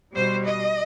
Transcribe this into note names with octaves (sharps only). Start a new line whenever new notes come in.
B2 G3 C5
D#5